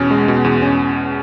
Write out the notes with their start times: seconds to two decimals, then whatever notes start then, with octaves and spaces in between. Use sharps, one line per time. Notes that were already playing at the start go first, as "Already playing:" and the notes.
Already playing: E2 B2 C#4
0.11 G#3
0.28 B2
0.44 E2
0.62 C#4